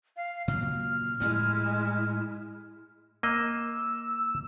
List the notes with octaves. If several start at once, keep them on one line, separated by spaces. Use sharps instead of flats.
F5
A#2 C#3 F#3 F6
A2 F3 G#3 E4
A#3 D#5 E6